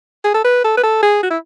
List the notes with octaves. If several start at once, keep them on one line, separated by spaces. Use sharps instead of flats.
G#4
A4
B4
A4
B4
A4
G#4
F#4
E4